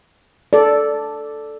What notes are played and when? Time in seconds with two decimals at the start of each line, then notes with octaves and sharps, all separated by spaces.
0.53 A4 D5